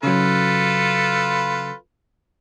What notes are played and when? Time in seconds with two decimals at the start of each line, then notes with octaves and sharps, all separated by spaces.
0.03 C#3 F#3 F4 A4 B4